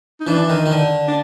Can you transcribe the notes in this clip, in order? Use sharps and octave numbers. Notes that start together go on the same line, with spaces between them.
D#4
E3 D4
D#3
D#3
D3
D4